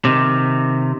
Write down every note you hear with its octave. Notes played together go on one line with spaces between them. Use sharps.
C3 D#3